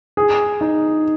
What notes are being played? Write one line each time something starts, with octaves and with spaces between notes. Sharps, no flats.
G#4
D#4